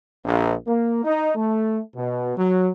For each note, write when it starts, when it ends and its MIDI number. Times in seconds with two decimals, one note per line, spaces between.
0.23 0.54 34
0.66 1.02 58
1.04 1.34 63
1.35 1.80 57
1.95 2.36 47
2.37 2.69 54